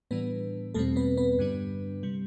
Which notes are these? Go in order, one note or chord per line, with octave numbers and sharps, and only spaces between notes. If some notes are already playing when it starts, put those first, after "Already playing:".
A2 E3 G3 B3 D4 B4
E2 B2 G3 A3 C4 A4
B3 B4
B3 B4
G2 D3 G3 D4
C3 G3